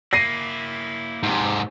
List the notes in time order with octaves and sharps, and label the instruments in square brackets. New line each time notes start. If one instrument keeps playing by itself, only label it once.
[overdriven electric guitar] A#3 E4 [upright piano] A#6 C7 D#7
[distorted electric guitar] G#2 C3